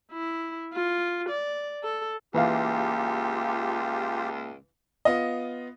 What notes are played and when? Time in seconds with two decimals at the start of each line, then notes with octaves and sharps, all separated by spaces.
0.12 E4
0.73 F4
1.29 D5
1.83 A4
2.34 C#2 E3 A#3 F4 G4 E5 F5
5.05 B3 F4 D#5